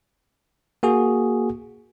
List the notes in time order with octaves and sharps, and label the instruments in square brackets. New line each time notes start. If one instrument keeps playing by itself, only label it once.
[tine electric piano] A#3 F#4 G#4